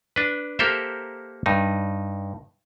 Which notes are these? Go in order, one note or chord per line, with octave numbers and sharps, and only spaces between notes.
D4 B4
A#3 G4 A4 A#4 C5 E5
G2 D#4